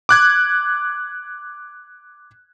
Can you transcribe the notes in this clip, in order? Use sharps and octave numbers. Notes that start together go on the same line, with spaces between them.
D6 F#6 G#6